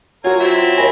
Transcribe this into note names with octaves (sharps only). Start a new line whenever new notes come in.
F#3 F4 F#4 A#4 G#5
C4 E4 E5
D#2 G#5 B5 A#6